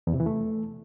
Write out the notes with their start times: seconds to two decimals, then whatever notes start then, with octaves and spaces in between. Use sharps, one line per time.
0.07 E2
0.13 C3
0.20 E3
0.26 A3